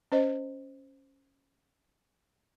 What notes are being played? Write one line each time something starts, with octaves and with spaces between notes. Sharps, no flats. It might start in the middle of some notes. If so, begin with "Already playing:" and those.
C#4 C5 D#5